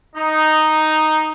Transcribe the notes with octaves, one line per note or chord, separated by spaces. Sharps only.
D#4